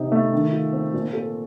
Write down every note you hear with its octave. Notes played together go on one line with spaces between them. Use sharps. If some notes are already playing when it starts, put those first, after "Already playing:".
Already playing: C3 D#4
A3
D#3
F4
C4
A#2
A4